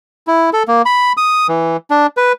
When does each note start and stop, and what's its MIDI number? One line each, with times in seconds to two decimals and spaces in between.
0.27 0.50 64
0.53 0.63 69
0.68 0.82 58
0.86 1.13 83
1.17 1.47 87
1.48 1.77 52
1.91 2.07 62
2.17 2.32 71